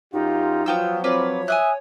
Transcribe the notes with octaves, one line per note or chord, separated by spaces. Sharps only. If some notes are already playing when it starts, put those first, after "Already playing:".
F#2 D#4 F4 G4
F3 F#3 B3 F4 G5 E6
C4 F4 B4 C#5 D5
E5 G#5 D#6 F#6